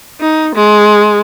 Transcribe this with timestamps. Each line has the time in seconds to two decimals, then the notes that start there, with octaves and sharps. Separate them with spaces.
0.21 D#4
0.55 G#3